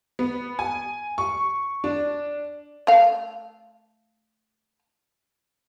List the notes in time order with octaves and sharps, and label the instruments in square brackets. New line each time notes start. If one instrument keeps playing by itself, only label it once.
[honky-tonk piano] B3
G#5
C#6
D4
[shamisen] A3 F5